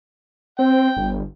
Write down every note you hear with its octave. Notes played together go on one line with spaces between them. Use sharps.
C4 G5
G1